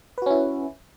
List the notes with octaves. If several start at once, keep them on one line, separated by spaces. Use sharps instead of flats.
C#4 E4 F#4 B4